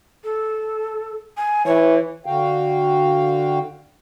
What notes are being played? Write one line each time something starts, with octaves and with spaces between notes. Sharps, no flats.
A4
G#5
E3 C#5
D3 F#4 F5 G5